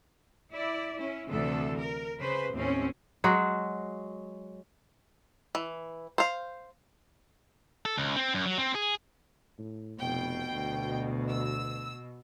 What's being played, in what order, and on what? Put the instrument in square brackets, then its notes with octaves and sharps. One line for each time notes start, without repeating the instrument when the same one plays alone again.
[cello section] E4 D5
C#4 E4
D2 C3 E3 A4
A#4
C#3 B4 C5
D#2 A2 C4 C#4
[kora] F#3 G#3 F#4
[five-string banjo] E3
C5 F5
[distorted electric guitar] A4
C#2
C4
F#2
F#3
C4
G#4
[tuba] A2
[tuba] F1 [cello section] B2 [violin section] G5
[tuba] D2
[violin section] E6